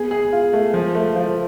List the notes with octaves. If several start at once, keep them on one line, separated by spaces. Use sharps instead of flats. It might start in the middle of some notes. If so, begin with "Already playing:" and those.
Already playing: B3 G#4
G#4
F4
A3
F3
A3
F3